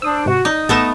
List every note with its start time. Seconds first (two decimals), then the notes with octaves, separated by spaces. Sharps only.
0.02 D4 C5 D#6 E6
0.26 G#2 C3 F#4
0.45 D#4 D5 D#6
0.69 A1 A3 B3 A4 A#6 E7